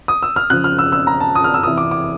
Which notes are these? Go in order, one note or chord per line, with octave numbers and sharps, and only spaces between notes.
D#6
E6
F6
C#3 F3 F#6
F6
E6
E6
A#5
A5
D#6
F6
E6
C3 E3 D#6
D6
D6